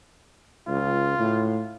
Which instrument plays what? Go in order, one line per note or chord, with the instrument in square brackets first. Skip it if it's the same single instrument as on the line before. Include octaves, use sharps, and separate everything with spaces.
[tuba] C#2 [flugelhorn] F4
[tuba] A2